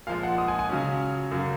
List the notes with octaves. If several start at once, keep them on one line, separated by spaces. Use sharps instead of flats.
A#2 F3 G#3 F5
F#5
D#6
G#5
G#5
C#3 F#3 C#4
F#2 C#3 F#3